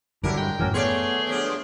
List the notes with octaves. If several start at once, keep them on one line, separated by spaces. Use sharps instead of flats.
G2 D3 F#3 D4 E4 G4 A#4
G#3 G5
F#2 A2 E3 C#4 F#4 A#4
A3 B3 G#4 C#5 D5 C6
G2 F3 D4